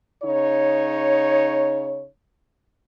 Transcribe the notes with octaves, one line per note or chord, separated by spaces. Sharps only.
C#3 D#4 C#5